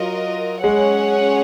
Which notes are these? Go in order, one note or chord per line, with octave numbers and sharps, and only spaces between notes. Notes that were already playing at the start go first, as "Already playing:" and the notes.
Already playing: F#3 F4 A#4 D#5
G#3 C#4 G#4 C#5 F#5